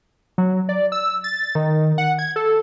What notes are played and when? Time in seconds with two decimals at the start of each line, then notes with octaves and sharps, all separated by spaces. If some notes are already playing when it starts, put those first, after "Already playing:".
0.38 F#3
0.69 D5
0.92 E6
1.24 A6
1.55 D#3
1.98 F#5
2.19 G#6
2.36 A4